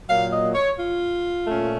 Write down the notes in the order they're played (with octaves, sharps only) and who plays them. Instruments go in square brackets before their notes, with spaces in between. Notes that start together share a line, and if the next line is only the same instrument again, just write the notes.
[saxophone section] A#2 F#3 A#3 F5
D#5
C#5
F4
A#2 A3 C#4